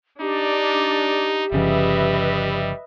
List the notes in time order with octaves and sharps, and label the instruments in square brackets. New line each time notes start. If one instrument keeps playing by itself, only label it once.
[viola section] D4 D5 [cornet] D#4 [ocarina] G4
[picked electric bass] G1 C#3 F3 [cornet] G3 [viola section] B4 D#5 E5